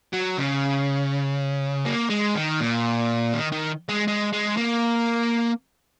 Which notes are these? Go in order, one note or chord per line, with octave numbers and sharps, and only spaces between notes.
F#3
C#3
A#3
G#3
D#3
A#2
D#3
D#3
G#3
G#3
G#3
A#3